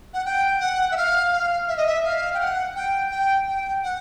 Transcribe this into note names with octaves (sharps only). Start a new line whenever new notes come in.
F#5
G5
F#5
E5
F5
F5
E5
D#5
E5
F5
G5
F#5
G5
G5
G5
F#5